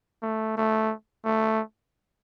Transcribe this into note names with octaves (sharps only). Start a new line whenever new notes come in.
A3
A3
A3